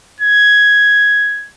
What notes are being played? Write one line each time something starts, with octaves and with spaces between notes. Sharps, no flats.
G#6